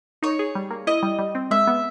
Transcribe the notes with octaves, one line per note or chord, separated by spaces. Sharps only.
D#4 C#5
G#4
G3
A#3
E4 D#5
G3
G3
C4
G#3 E5
B3